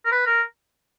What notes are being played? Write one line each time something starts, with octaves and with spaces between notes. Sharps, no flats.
A#4
B4
A#4